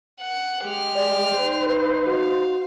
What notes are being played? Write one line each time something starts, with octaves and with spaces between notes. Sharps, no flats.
F#5
G#3 G4 F6
D5
D#4 C5
B4
F#4 F5